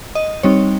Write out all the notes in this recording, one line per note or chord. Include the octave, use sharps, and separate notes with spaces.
D#5
G3 C4 D#4 C#5